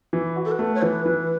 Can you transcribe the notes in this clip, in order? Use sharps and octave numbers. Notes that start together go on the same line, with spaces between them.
E3
F#4
A4
B4
A3
C#5
E3 B4
E3